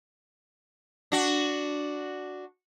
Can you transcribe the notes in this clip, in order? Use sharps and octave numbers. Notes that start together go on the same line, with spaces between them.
D4 F#4